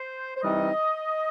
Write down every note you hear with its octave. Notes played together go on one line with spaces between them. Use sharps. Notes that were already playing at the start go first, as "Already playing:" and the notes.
Already playing: C5
C5
C3 E3 G3 C4 D#4 D#5